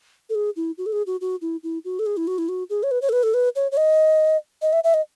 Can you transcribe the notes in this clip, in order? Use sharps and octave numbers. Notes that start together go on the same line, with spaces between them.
A4
G#4
E4
F#4
A4
G#4
F#4
F#4
E4
E4
F#4
A4
G#4
E4
F#4
E4
F#4
G#4
C#5
B4
C#5
A4
B4
A4
B4
C#5
C#5
D#5
D#5
E5
E5
D#5